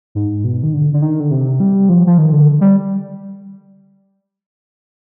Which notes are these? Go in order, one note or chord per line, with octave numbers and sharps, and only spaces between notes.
G#2
B2
D#3
D3
D3
D#3
D3
C3
G3
F3
F3
D#3
D3
G3